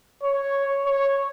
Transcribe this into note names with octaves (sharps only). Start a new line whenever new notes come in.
C#5
C#5